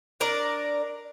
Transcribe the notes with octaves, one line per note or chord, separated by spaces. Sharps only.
D4 A#4 D5